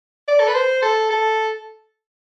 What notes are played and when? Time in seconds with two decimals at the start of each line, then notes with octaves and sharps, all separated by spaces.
0.28 D5
0.40 A4
0.48 B4
0.55 C5
0.82 A4
1.11 A4